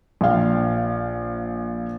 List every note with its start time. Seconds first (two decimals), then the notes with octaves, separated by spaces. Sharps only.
0.21 A#1 F5